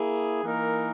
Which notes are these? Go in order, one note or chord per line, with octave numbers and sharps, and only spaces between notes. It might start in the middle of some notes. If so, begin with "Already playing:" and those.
Already playing: A#3 E4 G#4
E3 A#3 D#4 A#4